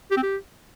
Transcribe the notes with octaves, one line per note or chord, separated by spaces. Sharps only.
G4
C4
G4